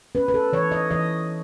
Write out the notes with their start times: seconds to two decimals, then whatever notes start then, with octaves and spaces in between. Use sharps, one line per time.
0.15 C#4 B4
0.28 B4
0.34 A4
0.53 E3 C#5
0.72 D#5
0.91 E3 D#5